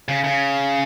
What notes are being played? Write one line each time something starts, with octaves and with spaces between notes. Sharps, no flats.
C#3
C#3